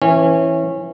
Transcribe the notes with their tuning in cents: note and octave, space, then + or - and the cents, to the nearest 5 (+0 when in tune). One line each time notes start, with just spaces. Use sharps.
E3 +0 C#4 -20